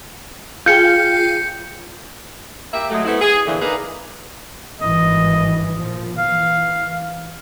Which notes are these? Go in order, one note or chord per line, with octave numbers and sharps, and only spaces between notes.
F4 G#4 G5 G6 C#7
A#3 G4 E5
F#3 G#3 A3
A3 B3 C4 E4
G#4
E2 A#2 D3 E3 F3
A#3 D4 D#4 G#4 B4
G#1 G2 E3 D#5
A#2 F3
E3 F5